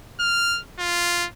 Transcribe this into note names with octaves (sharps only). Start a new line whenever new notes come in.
F6
F4